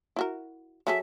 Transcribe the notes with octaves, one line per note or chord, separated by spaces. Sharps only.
E4 F#4 A#4
F#3 G#4 A4 E5